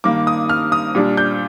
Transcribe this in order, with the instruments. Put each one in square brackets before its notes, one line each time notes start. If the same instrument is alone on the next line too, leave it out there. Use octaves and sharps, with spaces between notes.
[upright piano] G2 D#3 A#3 D6
D#6
F6
D#6
A#2 G3 D4
G6